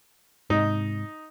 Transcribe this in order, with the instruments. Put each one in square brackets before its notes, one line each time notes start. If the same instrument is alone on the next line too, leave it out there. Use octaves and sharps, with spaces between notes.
[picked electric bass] G#2 C3 [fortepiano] D#4